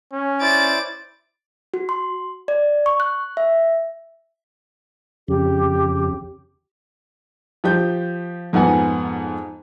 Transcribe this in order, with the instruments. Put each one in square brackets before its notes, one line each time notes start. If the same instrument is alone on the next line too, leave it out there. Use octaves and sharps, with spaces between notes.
[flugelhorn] C#4
[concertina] E4 C5 D5 [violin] A6 D7
[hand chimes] F#4
C6
D5
C#6
F#6
E5
[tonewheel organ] F2 C#3 [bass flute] G4
[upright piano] F3 G4 G6
F2 G#2 B3 F#5 G#5